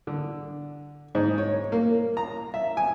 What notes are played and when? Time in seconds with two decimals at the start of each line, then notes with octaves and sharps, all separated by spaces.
0.07 D3
1.15 G#2
1.38 C#5
1.72 A#3
2.17 A#5
2.54 E5
2.77 G#5